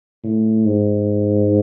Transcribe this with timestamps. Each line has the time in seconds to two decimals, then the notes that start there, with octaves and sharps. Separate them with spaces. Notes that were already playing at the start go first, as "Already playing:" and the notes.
0.24 A2
0.65 G#2